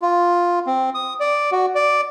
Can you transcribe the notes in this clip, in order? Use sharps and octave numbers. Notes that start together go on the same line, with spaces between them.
F4
C4
D#6
D5
F#4
D5